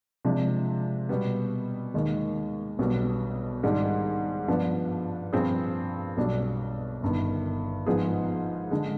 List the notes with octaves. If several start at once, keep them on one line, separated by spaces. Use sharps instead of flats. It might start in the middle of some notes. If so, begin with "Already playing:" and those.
C3 F3 G#3 D4
B2 G3 B3
D#2 D#3 G#3
B1 B2 G3 B3 D4
G#2 D#3 G3 D4
G2 F3 B3 D4
G2 F3 C4 F4 G#4
B1 B2 G3 D4
G1 G2 D#3
G#2 F3 B3 D#4 G#4
D3 G#3